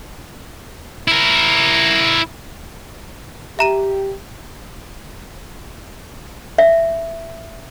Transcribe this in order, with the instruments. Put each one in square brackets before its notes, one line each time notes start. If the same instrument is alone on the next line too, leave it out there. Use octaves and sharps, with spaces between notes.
[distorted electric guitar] E4 A#4
[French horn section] G4 [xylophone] E5 A#5 D#7
[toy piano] E5